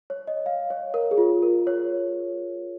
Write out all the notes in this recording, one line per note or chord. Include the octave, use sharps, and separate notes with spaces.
C#5
D#5
F5
C#5
A#4
G#4
F4
A#4
C#5